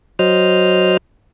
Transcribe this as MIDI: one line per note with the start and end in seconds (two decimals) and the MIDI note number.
0.19 0.97 54
0.19 0.97 72
0.19 0.97 75
0.19 0.97 89